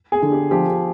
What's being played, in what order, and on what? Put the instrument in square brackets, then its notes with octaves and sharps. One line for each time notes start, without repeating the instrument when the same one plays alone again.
[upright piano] G#4
[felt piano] D3
[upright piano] G4
[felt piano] F3 [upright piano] G4